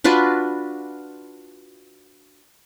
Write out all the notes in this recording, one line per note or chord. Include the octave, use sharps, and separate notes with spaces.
D4 F4 F#4 B4